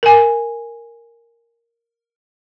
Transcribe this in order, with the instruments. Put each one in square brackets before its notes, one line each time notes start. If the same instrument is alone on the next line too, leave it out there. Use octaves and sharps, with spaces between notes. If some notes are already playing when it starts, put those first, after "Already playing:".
[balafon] A#4 G#5